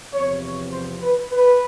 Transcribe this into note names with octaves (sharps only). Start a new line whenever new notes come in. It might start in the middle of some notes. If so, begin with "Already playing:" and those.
E2 C3 F3 C#5
C#5
C5
B4
B4